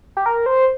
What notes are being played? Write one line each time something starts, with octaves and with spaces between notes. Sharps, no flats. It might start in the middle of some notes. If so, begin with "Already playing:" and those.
G4
A#4
C5